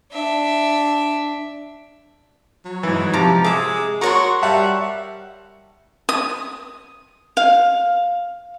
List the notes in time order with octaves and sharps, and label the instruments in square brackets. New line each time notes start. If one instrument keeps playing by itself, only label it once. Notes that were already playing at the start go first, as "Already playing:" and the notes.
[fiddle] D4 E5
[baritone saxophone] F#3
[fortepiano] G#2 E3
[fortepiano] C3 F3 [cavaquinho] A#5 D6
[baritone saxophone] G#3 [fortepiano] G#4 [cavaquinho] E5 D6
[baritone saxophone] F#4 [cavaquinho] A#4 C#5 C6
[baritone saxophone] G3 [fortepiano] E5 F#5 A5
[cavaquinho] D#6
F5